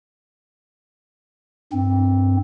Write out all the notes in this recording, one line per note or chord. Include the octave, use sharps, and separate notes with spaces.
G2 C4